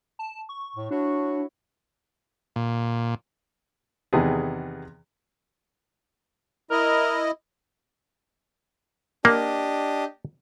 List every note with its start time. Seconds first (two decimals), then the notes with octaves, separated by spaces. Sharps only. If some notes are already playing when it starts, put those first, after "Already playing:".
0.19 A5
0.49 C#6
0.76 A2
0.91 D4 E4 F#4 C#5
2.56 A#2
4.13 E2 C3 D#3 B3 G#4
6.71 E4 A#4 D#5
9.25 A#3 D4 G4 D#5